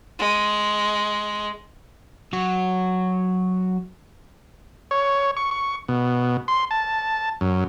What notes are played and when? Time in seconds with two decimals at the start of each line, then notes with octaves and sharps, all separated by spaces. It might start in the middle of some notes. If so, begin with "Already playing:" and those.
0.19 G#3
2.33 F#3 F#4
4.91 C#5
5.37 C#6
5.51 C#6
5.88 B2
6.48 C6
6.71 A5
7.41 F#2